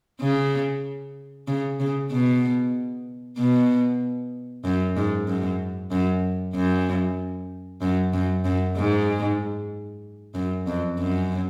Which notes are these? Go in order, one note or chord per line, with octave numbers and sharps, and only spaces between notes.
C#3
C#3
C#3
B2
B2
F#2
G#2
F#2
F#2
F#2
F#2
F#2
F#2
G#2
F#2
F2
F#2